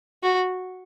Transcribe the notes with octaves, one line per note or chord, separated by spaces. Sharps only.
F#4